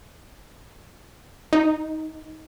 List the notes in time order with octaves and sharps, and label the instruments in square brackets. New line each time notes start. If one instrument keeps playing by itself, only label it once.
[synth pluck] D#4